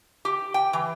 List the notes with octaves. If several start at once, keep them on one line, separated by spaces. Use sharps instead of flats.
G4
G5
E3